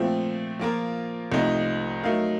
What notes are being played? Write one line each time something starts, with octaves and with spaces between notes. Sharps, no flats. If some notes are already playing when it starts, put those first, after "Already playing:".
Already playing: A#2 F3 A3 C4
F3 A#3 F4 A#4
C2 C3 F3 A3 D#4
F#3 A3 D#4 A#4 F5